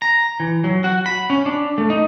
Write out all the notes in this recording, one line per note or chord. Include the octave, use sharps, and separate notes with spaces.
A#5
E3
F#3
F#4
B5
C#4
D4
A3
D#4